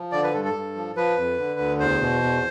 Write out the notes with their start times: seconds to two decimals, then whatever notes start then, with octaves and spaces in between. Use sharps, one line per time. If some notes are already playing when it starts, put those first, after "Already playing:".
Already playing: F3
0.12 D3 D5
0.23 B4
0.33 G2 A4
0.44 A4
0.54 G2
0.76 F3
0.96 F3 B4
1.17 F2
1.39 D3
1.60 D2
1.80 E2 C5
2.01 B2
2.23 E2